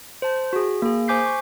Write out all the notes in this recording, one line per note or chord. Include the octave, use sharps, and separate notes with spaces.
C5 A5
F#4 G#4
A#3 G#4
C5 G#5 D6 G6 B6 C7
C#6